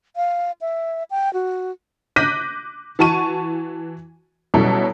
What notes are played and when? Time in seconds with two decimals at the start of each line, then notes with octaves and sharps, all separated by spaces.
0.16 F5
0.61 E5
1.11 G5
1.34 F#4
2.16 D6 F#6 G6 A#6 B6 D#7
2.99 E3 F#4 A5 C#6 D#7
4.54 B2 F#3 G3 C#4 E4 A4